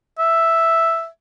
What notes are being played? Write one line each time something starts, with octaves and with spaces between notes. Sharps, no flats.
E5